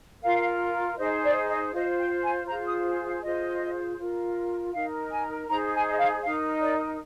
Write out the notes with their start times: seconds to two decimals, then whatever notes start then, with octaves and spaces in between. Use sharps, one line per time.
0.22 F4 A#4 F5
0.97 D#4 G#4 C5 D#5
1.23 D5
1.48 D#5
1.73 F4 C5 D#5
1.97 G5
2.23 G#5
2.47 F4 G#4 C5 A#5
2.66 D#6
3.04 F5
3.22 F4 G#4 C5 D#5
3.98 F4 A#4
4.73 D#4 A#4 F5
5.11 G#5
5.48 D#4 G#4 C5 A#5
5.73 G#5
5.88 D#5
5.98 F5
6.23 D#4 A#4 F5
6.60 D5